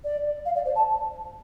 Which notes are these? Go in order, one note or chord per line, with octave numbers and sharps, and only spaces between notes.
D5
F5
D5
C5
A5